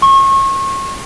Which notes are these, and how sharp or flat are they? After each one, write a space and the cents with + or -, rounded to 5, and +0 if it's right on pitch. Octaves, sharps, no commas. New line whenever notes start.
C#6 -35